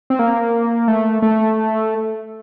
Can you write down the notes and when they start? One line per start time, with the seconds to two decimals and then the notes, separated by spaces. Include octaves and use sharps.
0.10 C4
0.19 A#3
0.88 A3
1.22 A3